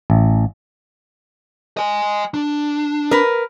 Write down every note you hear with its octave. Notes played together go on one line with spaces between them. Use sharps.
A1
D#5 G#5
D4
A#4 B4